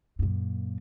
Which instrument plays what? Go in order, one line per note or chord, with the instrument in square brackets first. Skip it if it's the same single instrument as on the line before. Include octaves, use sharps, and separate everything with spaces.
[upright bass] F#2 A#2